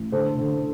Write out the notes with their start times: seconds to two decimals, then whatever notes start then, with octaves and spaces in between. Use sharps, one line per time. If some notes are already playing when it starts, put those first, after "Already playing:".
Already playing: A1
0.12 D3 A4 C5
0.37 D3